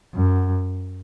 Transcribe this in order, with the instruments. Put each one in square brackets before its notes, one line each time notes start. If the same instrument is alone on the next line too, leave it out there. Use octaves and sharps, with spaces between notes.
[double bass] F#2